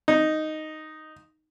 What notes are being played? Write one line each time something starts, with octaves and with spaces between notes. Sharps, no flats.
D#4